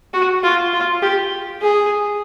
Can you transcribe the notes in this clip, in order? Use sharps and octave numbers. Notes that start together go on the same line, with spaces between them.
F#4
F4
F4
G4
G#4